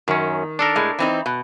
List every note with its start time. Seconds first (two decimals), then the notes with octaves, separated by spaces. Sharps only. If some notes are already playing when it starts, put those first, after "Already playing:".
0.08 F#2 D#3 C#4
0.59 D4 A4 A#4
0.76 A2 G#3
0.99 E3 C4 D#4
1.26 B2